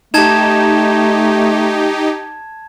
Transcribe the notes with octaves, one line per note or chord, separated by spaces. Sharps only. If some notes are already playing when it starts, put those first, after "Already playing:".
A3 D#4 G4 A5 G#6 E7